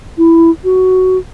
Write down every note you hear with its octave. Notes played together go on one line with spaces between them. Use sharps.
E4
F#4